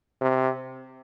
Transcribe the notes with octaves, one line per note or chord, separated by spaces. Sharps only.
C3